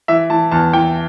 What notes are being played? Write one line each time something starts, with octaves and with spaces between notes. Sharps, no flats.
E3 E5
E3 A5
E2 A5
E3 G5